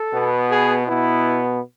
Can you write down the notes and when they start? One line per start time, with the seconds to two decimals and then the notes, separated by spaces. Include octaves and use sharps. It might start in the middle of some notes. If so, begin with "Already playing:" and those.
Already playing: A4
0.12 B2 B3
0.49 G#4
0.86 B2 B3 E4